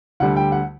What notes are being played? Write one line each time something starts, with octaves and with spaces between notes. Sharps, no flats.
D2 D3 G3 F#5
G5
F#5